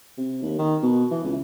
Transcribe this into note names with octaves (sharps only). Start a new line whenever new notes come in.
C3
D#2
D#3
B2
E3
C#2